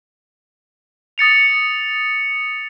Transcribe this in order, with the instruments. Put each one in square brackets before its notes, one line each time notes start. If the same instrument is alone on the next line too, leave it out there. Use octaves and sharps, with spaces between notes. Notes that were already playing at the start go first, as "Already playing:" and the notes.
[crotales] D#6 A6 C#7 F7